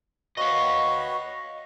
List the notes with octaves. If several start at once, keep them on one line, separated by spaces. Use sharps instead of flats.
F#4 B4 C#5 D#5 F5